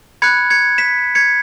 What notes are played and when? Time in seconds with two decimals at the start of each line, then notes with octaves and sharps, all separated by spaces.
0.22 B5 F#6 G#6 C#7
0.50 G#6 C#7
0.78 B6 E7
1.15 G#6 C#7